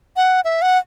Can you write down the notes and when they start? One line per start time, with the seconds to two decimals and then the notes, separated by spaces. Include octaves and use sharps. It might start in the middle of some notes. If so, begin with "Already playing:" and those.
0.16 F#5
0.44 E5
0.62 F#5